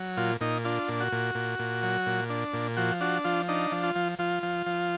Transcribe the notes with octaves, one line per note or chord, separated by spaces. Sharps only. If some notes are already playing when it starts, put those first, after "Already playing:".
Already playing: F#3
A#2 F4
A#2 D#4
D4 F4
A#2
F#4
A#2
A#2
A#2
F#3
A#2
D4
A#2
F3 F#4
D4 F#4
F3 F4
D4 D#4
F3
F4
F3
F3 F4
F3
F3